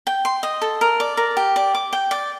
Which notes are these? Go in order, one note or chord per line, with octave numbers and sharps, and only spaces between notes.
G5
C6
D#5
A4
A#4
D5
A#4
G4
D5
D6
G5
D5